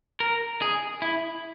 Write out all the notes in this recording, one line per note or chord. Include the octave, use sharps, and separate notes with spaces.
A#4
G#4
E4